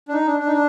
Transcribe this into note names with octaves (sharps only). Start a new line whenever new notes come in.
D4
D#4
D4
D4
D#4
D4